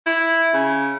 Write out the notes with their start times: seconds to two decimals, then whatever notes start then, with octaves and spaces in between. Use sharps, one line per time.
0.07 E4
0.54 C#3